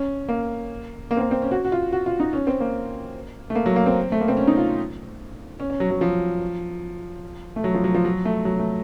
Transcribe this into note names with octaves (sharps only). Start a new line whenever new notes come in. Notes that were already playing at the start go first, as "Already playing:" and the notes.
Already playing: C#4
A#3
A#3
C4
A#3
C4
C#4
F#4
F#4
F4
F#4
F4
D#4
C#4
C4
A#3
A3
A#3
F#3
A#3
C4
A3
A#3
C4
C#4
D#4
F4
C#4
C#4
F#3
F#3
F3
A3
F#3
F3
F#3
F3
F#3
A3
F#3
A3